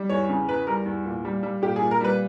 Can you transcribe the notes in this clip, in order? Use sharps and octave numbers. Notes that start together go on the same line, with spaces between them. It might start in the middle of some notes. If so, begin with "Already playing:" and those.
Already playing: G3
E2 C#5
C#3
E2 B4
G3 A#4
E2
A#2
G3
G3
A#2 G4
G#4
A#2
A#4
G3 B4